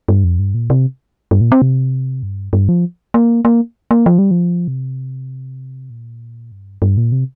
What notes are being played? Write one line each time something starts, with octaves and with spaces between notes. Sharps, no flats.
G2
F2
G2
A#2
C3
G2
A#2
C4
C3
G2
G2
F3
A#3
A#3
A#3
F3
G3
F3
C3
A#2
G2
G2
A#2
C3